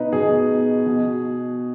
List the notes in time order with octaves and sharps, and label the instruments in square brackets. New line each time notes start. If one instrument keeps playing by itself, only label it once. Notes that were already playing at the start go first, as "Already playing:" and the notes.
Already playing: [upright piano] B2 D#4 B4
B2 G#4
B2